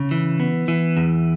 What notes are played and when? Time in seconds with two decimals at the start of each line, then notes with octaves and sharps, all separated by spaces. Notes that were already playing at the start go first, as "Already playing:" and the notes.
Already playing: C#3
0.11 E3
0.40 B3
0.68 E3
0.97 E2